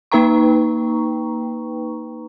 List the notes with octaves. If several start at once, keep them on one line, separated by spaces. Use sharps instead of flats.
A#3 D#4 B4 G5 A#5 C#6